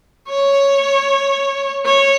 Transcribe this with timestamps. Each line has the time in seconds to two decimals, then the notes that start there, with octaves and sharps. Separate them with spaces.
0.29 C#5
1.85 C#5